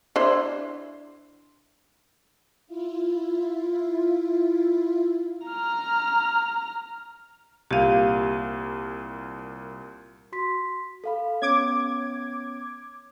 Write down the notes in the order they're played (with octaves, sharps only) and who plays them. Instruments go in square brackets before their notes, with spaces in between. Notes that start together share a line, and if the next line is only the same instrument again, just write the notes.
[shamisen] D4 E4 C5
[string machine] E4 F4
[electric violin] A#5 F6
[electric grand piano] C2 A#2 D#7 [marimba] G4 F5
[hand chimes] F#4 C6 B6
A4 F5 B5
[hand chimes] B3 C#4 C#5 [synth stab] D6 G#6